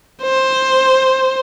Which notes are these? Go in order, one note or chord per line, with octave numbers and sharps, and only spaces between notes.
C5